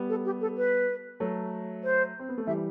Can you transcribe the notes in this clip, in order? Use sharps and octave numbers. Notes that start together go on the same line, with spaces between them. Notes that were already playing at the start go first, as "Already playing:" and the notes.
Already playing: G3 B3
A4
G4
A4
B4
F#3 A3
C5
C4
B3
A3
E3 G3 E5